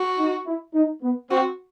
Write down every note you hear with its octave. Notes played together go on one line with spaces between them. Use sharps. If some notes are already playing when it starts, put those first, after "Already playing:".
Already playing: F#4
D#4
E4
D#4
B3
C4 F#4